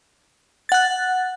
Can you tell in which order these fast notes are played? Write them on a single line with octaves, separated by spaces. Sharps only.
A6 F#5 F#6